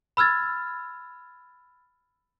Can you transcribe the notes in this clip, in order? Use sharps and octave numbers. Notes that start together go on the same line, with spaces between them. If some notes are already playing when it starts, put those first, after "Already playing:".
B5 E6 F6 G#6 A6